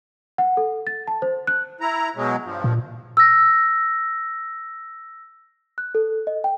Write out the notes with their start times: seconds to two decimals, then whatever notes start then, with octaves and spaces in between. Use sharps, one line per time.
0.38 F#5
0.57 A4
0.87 A6
1.08 A5
1.22 C5
1.47 F#6
1.81 E4 A#5
2.16 B2 F#3 G#3
2.45 G2 F3
2.64 A#2
3.17 E6 A#6
5.78 F#6
5.95 A4
6.27 D#5
6.44 G5